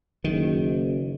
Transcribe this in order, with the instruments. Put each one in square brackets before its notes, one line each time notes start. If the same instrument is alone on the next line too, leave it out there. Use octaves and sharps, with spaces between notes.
[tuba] F#1 [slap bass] D#3